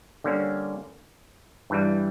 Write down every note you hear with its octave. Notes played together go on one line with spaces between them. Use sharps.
D3 G3 A#3 C#4
G2 E3 G3